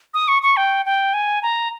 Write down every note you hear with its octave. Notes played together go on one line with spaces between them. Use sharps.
D#6
C#6
C#6
G5
G5
G#5
A#5